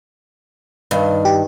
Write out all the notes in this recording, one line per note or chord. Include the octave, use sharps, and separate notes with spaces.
G2 D#3
G4